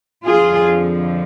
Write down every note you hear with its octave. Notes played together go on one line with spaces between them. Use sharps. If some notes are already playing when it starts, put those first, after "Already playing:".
F2 D3 F3 F4 G#4